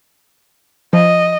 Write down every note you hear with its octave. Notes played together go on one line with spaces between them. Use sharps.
F3 D#5